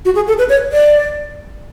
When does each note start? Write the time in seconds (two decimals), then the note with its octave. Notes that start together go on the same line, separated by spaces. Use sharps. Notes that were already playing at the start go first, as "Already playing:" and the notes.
0.05 F#4
0.15 G#4
0.28 A4
0.38 B4
0.49 C#5
0.73 D5